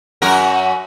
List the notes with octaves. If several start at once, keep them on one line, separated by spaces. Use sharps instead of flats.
F#2 F#4 A#4